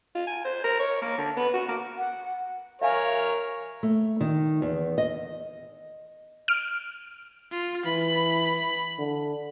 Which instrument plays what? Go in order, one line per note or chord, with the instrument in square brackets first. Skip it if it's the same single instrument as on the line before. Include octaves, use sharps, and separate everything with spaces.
[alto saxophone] F4
G#5
C5
A#4
C#5
A#3
D3
B3
F#4
A#3
[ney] F#5
[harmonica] A#4 C#5 [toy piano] E5 F5 G#5
[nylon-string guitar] A3
D#3
E2
D#5
[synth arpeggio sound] F6 D7
[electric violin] F4
[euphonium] E3 [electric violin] B5
[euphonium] D3